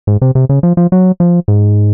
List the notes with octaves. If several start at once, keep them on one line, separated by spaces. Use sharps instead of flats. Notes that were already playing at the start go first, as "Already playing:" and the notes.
G#2
C3
C3
C#3
F3
F3
F#3
F3
G#2